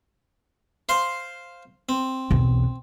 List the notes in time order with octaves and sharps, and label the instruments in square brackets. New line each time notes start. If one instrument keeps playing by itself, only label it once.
[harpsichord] C5 F5 C6
C4
[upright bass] B1 E2